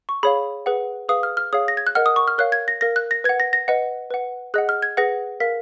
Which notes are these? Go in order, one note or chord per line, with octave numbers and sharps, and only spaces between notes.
C#6
G#4 C#5 F5 B5
G#4 B4 F#5
G#4 B4 F5 D#6
F6
F6
G#4 C#5 F5 D#6
A#6
G#6
F#6
A#4 D#5 F#5 F6
D#6
C#6
F6
A#4 C#5 F5 F#6
G#6
A#6
A#4 F5 A#6
F#6
A#6
B4 F#5 G#6
A#6
A#6
B4 D#5 F#5
B4 F#5
G#4 D#5 F#5 F#6
F6
G#6
G#4 B4 F#5 A#6
A#4 F5 B6